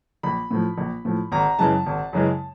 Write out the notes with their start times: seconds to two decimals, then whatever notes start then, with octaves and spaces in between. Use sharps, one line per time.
0.23 A#1 B5
0.51 A2 F3
0.78 A#1
1.05 A2 F3
1.32 G#1 A#5
1.59 F#2 C#3 E3 G#3 A5
1.86 G#1
2.13 F#2 C#3 E3 G#3